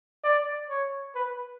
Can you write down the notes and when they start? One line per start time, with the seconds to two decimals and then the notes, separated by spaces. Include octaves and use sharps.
0.24 D5
0.70 C#5
1.15 B4